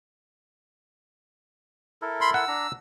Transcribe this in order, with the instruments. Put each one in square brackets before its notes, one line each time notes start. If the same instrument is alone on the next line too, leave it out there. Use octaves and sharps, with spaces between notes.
[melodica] E4 A4 A#4
[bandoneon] B5 C6
[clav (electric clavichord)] F#5 [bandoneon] E6
[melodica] D4 A#5